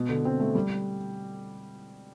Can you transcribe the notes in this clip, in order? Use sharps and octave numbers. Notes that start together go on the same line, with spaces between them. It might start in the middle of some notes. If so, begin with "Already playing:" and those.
Already playing: B2
D3
C4
A3
G3